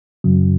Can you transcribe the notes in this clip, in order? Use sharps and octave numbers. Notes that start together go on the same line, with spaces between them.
F#2 C#3 F#3